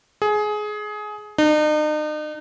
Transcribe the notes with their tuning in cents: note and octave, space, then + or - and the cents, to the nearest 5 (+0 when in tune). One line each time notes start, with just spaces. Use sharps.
G#4 +20
D#4 -40